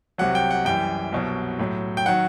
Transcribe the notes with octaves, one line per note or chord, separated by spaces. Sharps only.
C2 C3 F#3 F#5
G5
F#5
F#2 E3 G3 G5
C2 B2 F#3
A2 F#3
G5
D#3 F#3 F#5